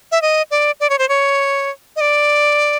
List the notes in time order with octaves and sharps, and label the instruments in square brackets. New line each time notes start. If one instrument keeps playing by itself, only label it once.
[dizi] E5
D#5
D5
D5
C#5
C5
C#5
D#5
D5